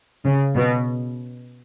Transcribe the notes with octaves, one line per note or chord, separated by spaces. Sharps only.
C#3
B2